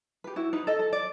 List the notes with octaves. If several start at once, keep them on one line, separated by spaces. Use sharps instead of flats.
G4 B4
E4 F#4
D#4 B4
A4 D#5
A4
D5